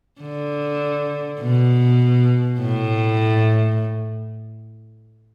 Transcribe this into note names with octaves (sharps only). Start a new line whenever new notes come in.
D3
B2
A2